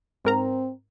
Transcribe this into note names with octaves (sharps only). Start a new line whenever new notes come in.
G#2 C4 A#4 A#5